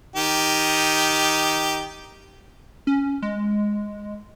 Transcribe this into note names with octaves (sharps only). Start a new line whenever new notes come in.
D#3 D#4 G4
C#4
G#3